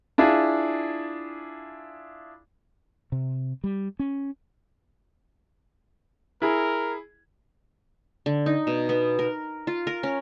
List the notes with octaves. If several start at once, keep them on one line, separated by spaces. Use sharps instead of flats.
D4 E4 F4 G#4
C3
G3
C#4
E4 G#4 A#4
D3
D#4
B2
B3
A#4
F4
A#4
C#4